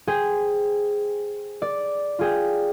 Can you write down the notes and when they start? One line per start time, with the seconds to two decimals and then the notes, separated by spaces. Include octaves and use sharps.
0.07 G#4 C5 G5
1.62 D5
2.19 F4 G#4 G5